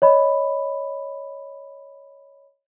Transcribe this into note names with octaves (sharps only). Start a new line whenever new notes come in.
C#5 D#5 B5